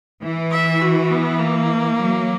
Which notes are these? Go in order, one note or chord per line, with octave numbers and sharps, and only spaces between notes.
E3
E5
F#4
B3
A#3
F#3